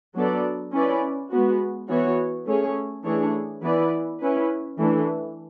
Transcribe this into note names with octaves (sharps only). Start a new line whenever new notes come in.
F#3 B3 D4 A4 D5
C#4 E4 B4 D5
G#3 B3 F#4
E3 B3 F#4 C#5
A3 C#4 G#4 C#5
E3 A3 D4 G#4 C#5
E3 B3 E4 B4 D5
C#4 E4 B4
E3 A3 D4